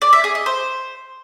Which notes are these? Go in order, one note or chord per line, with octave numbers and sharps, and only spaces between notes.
D5
E5
G#4
D#5
C5